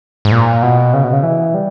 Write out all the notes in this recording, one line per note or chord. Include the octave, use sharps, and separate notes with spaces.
G#2
A#2
B2
C#3
B2
C#3
E3
G3